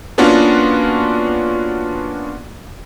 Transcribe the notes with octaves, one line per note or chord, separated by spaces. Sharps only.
A#3 B3 C#4 D4 F4 F#4